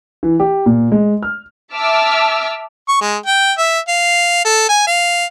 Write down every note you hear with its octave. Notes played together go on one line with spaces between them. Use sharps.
E3
G4
A#2
G#3
F6
E5 A5 D6 E6 F6
C#6
G#3
G5
E5
F5
A4
G#5
F5